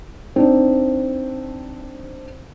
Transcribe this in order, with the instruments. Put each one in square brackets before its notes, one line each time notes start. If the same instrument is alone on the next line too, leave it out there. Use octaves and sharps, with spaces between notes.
[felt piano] C4 D4 D#4